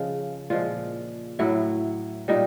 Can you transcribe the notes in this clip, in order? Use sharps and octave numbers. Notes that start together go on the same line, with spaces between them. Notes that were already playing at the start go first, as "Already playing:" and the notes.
Already playing: C#3 F3 G#3 F4
A#2 F3 G#3 F4
A2 F#3 E4
A#2 G3 D#4